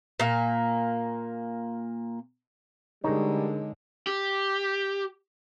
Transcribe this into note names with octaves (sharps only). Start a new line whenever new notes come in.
A#2 A#3
D3 G3 G#3 D4 D#4 G#4 A#4 C#5
G4